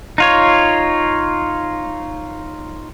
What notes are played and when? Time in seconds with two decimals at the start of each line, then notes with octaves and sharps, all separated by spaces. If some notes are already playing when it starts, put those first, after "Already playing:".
0.18 D#4 F4 C#5